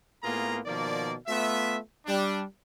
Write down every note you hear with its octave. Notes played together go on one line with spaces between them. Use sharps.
A2 A#3 B3 F4 G#4 A#5
B2 D#3 F3 A#3 D5
A3 B3 F4 E5
G3 D4